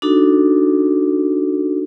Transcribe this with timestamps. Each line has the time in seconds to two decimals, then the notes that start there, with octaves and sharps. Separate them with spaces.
0.02 D4 D#4 F#4 A4